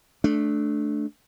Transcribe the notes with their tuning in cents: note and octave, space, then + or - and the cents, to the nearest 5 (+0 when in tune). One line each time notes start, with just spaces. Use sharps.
A3 -15 D4 +0